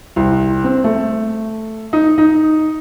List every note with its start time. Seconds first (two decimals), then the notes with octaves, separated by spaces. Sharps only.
0.16 C2
0.64 C4
0.84 A3
1.93 D#4
2.18 D#4